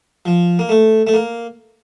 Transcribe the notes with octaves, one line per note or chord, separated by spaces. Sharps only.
F3
A#3
A3
A3
A#3